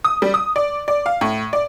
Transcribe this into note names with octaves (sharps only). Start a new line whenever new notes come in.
D#6
G3
D#6
D5
D5
F5
A2
D5